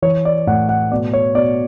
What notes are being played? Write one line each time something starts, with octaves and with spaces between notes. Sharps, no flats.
E3 C#5
D5
A2 F#5
F#5
B2 D5
C#5
B2 D5